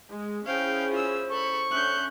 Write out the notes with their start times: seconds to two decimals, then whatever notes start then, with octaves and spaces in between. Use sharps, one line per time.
0.11 G#3
0.46 C#4 E4 G#4 C5 F5 G5
0.91 F4 E6
1.29 A4 B5 C#6
1.71 D3 C#4 E5 F#6 G6